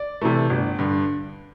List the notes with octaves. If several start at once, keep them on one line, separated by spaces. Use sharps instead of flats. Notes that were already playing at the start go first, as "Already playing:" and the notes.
Already playing: D5
C3 E3 A3
G1
G2 D3